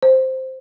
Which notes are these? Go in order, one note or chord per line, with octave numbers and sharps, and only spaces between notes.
C5